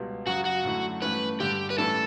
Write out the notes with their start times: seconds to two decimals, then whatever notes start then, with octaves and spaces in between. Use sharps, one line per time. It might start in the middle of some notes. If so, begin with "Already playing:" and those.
Already playing: C#2 B2 G3
0.26 F#2 C#3 F#3 F#4
0.45 F#4
0.63 F#2 D3 A3 E4
1.02 G2 E3 A3 C#4 B4
1.40 G2 D3 G3 G4
1.70 B4
1.77 A2 E3 G3 C#4 E4 A4